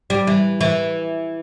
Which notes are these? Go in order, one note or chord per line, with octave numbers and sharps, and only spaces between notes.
G3
E3
E3